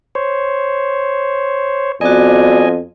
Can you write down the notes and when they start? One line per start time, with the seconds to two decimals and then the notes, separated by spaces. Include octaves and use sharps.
0.15 C5 C#5
2.01 F2 B3 F#4 D5 D#5 G#5